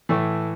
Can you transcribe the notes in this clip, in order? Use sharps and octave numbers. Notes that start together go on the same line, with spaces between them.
A2 E3 A3